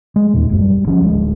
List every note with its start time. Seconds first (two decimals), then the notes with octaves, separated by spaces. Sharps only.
0.16 G#3
0.34 D#2 A#2
0.49 F#1 F#2
0.61 G3
0.86 G1 F3 C#4
1.00 D1 G#3